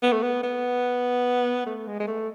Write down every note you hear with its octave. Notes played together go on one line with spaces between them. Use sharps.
B3
A3
B3
B3
A3
G#3
G#3
A3